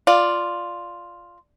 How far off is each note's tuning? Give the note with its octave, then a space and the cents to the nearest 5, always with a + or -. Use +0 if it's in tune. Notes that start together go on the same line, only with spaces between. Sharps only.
F4 +0 D5 +0